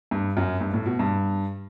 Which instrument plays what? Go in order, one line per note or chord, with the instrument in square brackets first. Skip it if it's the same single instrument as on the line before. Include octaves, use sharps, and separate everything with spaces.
[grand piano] G2
F#2
G2
A2
B2
G2